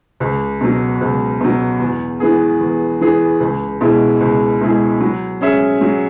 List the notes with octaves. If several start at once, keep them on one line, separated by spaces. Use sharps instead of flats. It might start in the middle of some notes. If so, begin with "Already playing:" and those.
C#2
B2 F#3
C#2
B2 F#3
E2
E3 B3 G#4
E2
E3 B3 G#4
C#2
B2 G#3 E4 G#4
C#2
B2 G#3 E4 G#4
F#3
C#4 G#4 C#5 E5
F#3